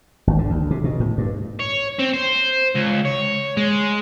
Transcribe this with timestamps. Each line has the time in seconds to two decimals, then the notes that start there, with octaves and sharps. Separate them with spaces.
0.27 G#1
0.38 D3
0.50 D2
0.71 C3
0.84 B2
1.00 A2
1.18 G2
1.60 C#5
1.99 C4
2.14 C5
2.76 C#2
3.06 C#5
3.57 G#3